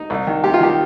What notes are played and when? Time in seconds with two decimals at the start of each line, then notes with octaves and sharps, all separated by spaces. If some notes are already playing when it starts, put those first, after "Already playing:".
Already playing: D#4
0.10 C2
0.27 D#3
0.44 C3 G4
0.54 F4
0.60 D#3 G4